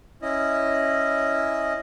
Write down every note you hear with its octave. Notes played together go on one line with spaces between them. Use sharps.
C#4 E4 D#5